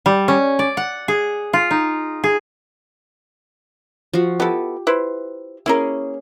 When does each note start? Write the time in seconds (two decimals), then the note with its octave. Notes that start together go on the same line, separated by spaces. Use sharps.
0.06 G3
0.28 C#4
0.59 D5
0.77 F#5
1.08 G#4
1.53 F4
1.71 D#4
2.24 G#4
4.13 F3 F#4
4.40 B3 E4 G4 A4
4.87 E4 B4 C5
5.66 A#3 C#4 E4 G#4 A#4